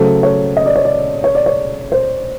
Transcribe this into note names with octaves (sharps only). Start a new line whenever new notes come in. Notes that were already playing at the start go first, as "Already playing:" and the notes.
Already playing: C#3 F#3 A3 C5
C#5
D#5
D5
C#5
D5
C#5
D5
C#5
C5